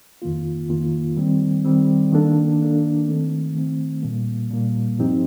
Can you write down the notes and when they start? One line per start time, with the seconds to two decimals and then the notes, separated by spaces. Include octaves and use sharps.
0.22 F2 D#3 A#3 F4
0.69 F2 D#3 A#3 F4
1.17 D#3 G3 C4
1.64 D#3 G3 C4
2.12 D#3 A#3 D4 A4
2.60 D#3 A#3 D4 A4
3.07 D#3 A3 C4
3.55 D#3 A3 C4
4.03 A#2 G3 A#3
4.51 A#2 G3 A#3
4.99 G2 F3 C4 D#4 G4